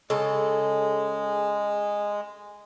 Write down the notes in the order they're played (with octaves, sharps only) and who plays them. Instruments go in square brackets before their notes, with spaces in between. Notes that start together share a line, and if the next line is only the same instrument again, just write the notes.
[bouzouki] C#3 A4 [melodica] G#3